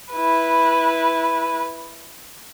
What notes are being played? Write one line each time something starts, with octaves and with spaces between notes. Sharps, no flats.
E4 B4